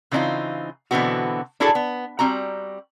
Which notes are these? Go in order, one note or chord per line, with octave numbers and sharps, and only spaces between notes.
C#3 E3 C4 D4 D#4 F4
B2 D3 E3 B3 C4 F#4
D4 E4 F#4 G#4 A4 D5
B3
G3 C4 F#4 A#5